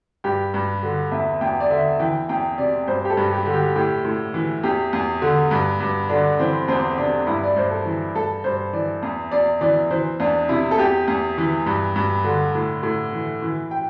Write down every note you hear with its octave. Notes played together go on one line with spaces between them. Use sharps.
G2 G4
G2
D3
E2 E5
E2 G5
D5
D3 E5
E3 G5
E2 G5
C3 D5
G2 C5
G4
A4
G2
G4
D3
G4
A2 G4
A2
E3
E2 G4
E2
D3
G2
G2
D3 D4
E3 C4
E2 C4
C3 D4
G2 E4
D5
G2 C5
A4
E3
G2 A4
G2 C5
E3 D5
E2
E2 D5
E3 D5
E3 C5
E2 D4
C3 E4
A4
E2 G4
E2
E3
G2
G2
D3
A2
A2
E3
E3
G5